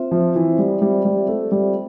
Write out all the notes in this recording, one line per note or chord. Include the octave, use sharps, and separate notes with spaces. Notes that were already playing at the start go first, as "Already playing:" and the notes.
Already playing: C4 F4 C5 E5
F3
E3
G3
G3
G3
A3
G3